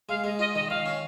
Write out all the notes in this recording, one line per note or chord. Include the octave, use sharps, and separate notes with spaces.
G#3 F5
G#3 D#5
F4 D#5
D#3 D#5
D#5
D#3 F5
C#4